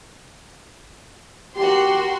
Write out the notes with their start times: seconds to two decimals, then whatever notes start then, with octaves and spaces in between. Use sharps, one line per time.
1.57 F#4 G4 A#4 C6